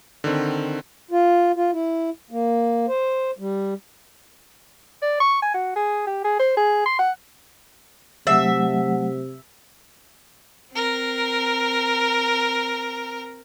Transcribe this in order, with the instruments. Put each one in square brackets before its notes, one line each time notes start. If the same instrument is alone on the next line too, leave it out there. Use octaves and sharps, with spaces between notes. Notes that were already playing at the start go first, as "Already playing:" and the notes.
[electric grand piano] D3 D#3 C4
[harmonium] F4
F4
E4
A#3
C5
G3
[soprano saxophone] D5
C#6
G#5
F#4
G#4
G4
G#4
C5
G#4
C6
F#5
[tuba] C3 [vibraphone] F#3 A3 F#5 [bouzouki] E5
[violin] C4 A#4